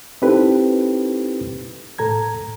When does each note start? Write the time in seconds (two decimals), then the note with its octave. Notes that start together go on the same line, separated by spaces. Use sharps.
0.22 C4 D#4 E4 G4 A4 B4
1.99 A2 A4 A#5 G#6